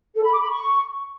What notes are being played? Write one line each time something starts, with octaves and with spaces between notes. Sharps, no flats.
A4
B5
D6
B5
C#6